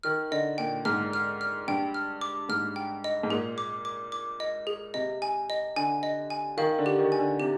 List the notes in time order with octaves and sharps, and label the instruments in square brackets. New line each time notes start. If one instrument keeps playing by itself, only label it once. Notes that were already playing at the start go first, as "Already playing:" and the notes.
[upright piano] D#3 [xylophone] F6
[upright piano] D3 [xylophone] D#5
[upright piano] A#2 [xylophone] G5
[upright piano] G#2 [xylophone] F6
[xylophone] F6
F6
[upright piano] G2 [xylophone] G5
[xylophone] F6
D6
[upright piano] G#2 [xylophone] F6
[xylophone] G5
D#5
[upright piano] G#2
[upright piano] A#2 [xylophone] G#4
[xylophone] D6
D6
D6
D#5
G#4
[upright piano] C3 [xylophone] D#5
[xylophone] G#5
D#5
[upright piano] D3 [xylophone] G#5
[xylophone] D#5
G#5
[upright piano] D#3 [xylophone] F5
[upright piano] D3
[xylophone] G4
[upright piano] D#3
[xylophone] G#5
[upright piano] D3
[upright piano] C3 [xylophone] G4